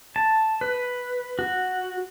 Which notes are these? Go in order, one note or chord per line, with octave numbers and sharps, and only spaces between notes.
A5
B4
F#4